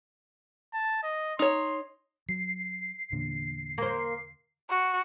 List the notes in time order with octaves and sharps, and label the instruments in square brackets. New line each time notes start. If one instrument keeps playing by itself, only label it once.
[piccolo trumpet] A5
D#5
[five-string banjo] D#4 C#5 [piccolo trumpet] C6
[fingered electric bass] F#3 [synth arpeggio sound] C7
[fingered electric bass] E2 A#2 D3
[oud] A#3 C5
[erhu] F#4